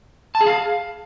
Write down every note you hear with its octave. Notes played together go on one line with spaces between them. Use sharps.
A5
G#4
F5